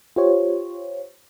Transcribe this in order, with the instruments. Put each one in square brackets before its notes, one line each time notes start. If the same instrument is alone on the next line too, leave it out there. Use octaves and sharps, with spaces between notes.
[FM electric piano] F4 G4 C5 C#5